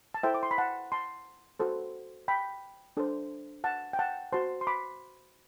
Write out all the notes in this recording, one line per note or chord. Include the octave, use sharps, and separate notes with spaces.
A5
E4 A4 C5 E5 G5
D6
C6
B5
F#5 A5
A5 C6
F#4 A4 C5
G5 B5
D4 A4 C5
F#5 A5
G5
F#5 A5
F#4 C5 A5 C6
C6
B5 D6